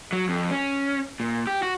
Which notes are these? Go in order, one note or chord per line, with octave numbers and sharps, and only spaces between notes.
F#3
F2
C#4
A#2
G4
F#4